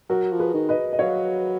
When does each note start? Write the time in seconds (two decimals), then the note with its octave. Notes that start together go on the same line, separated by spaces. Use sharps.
0.10 F#3 F#4 A#4
0.32 F3
0.39 G#4 B4
0.54 D#3
0.69 B4 D#5
0.93 D#5
0.99 F#3 C#5 F5